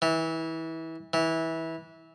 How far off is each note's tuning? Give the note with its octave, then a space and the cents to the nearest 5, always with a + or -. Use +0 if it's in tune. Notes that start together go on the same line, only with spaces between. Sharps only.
E3 -25
E3 -20